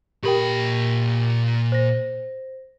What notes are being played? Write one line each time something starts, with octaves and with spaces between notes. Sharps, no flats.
A#2 G4 A#4 G5 B5
C5 A#6